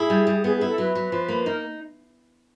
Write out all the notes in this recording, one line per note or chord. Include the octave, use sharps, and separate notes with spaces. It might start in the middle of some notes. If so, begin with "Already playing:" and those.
Already playing: E4 G#4
G3
G3
B3 G#4
G#4
E4
A4
F#3 B4
F#3
F3
A#3
D#4 A#4